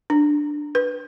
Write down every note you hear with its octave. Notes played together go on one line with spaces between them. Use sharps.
D4
B4